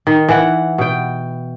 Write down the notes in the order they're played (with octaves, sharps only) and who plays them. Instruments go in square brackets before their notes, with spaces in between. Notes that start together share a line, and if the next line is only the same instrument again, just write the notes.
[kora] D#3
E3 F#5
B2 G5